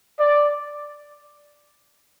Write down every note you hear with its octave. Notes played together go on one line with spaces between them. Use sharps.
D5